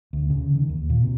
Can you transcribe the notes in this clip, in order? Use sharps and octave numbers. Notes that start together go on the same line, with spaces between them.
D2
C#3
D#3
D#2
A#2
C3